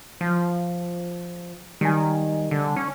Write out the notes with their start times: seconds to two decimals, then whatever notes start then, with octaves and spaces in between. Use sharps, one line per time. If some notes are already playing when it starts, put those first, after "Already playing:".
0.21 F3
1.81 D#3 G3 G#5
2.51 D3
2.76 C#4